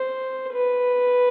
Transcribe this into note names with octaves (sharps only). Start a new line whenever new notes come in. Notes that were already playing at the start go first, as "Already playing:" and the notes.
Already playing: C5
B4